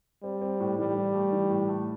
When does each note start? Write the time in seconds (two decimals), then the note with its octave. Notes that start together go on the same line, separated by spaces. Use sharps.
0.23 G3 C4
0.41 C4
0.60 A2
0.78 E3 G3
0.96 E3
1.14 A3
1.32 E3
1.50 A2
1.68 A3